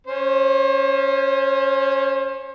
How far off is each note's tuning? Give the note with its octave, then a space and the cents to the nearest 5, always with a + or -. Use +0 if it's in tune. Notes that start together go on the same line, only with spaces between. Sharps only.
C#4 +0 C5 +35